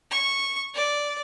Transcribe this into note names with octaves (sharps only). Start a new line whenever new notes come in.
C#6
D5